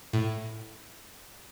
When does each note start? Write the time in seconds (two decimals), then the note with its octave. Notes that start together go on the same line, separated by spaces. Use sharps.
0.13 A2